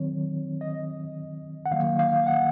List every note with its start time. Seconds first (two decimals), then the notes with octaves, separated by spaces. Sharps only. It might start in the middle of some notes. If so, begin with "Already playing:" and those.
Already playing: D#3 F#3 C4 C#5
0.61 D#5
1.66 F#5
1.71 D#3 F#3 A#3 F5
1.99 F5
2.27 F#5